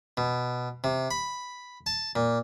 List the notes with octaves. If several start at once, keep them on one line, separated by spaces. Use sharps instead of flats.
B2
C3
B5
A5
A#2